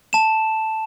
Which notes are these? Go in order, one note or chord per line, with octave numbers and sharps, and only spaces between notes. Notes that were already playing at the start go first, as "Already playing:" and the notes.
A5 E7